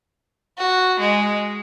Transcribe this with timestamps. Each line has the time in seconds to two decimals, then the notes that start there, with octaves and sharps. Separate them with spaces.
0.58 F#4
1.00 G#3